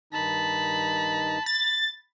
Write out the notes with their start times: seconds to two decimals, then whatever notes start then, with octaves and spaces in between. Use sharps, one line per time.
0.13 G2 D#3 D#4 A5 B5
1.46 A6